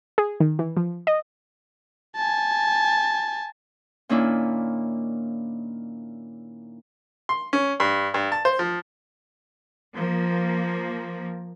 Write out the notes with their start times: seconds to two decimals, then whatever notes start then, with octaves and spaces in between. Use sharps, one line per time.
0.18 G#4
0.40 D#3
0.59 E3
0.77 F3
1.07 D#5
2.16 G#5 A5
4.09 A#2 D#3 A#3 C#4 D4 E4
7.29 C6
7.53 C#4
7.80 G2
8.14 G2
8.32 A5
8.45 C5
8.59 F3
9.96 F3 A#3